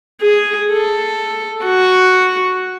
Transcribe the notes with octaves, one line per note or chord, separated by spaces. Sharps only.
G#4
A4
F#4